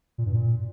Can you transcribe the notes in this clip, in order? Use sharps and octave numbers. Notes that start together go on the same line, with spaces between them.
A#2
G2
A#2